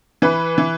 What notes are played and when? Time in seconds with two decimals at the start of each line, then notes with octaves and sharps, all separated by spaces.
0.22 E3 B4
0.58 E3